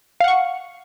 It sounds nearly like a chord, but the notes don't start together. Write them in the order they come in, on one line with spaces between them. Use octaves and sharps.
F5 F#5 C#6